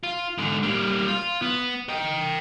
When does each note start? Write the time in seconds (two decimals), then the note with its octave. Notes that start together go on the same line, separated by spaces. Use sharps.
0.03 F4
0.38 G#2 D3
0.63 G3 A#3
1.08 F4
1.42 B3
1.89 D#5 G5